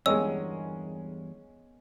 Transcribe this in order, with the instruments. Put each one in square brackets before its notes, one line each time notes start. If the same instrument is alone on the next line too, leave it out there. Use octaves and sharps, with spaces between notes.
[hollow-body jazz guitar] E2 G2 [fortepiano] G#3 C#4 [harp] B3 A#4 D#5 [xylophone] E6